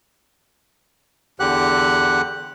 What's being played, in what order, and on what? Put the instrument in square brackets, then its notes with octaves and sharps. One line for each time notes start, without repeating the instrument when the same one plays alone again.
[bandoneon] E2 D3 G4 F#5 F#6